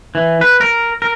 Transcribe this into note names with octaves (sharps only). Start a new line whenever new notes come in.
E3
B4
A#4
A#4